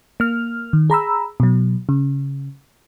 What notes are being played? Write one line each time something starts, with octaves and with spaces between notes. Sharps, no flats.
A#3 F6
D#3
G#4 A#5 B5 E6
B2 F#3
C#3